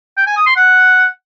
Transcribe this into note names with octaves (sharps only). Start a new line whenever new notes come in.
G5
G#5
D#6
C6
F#5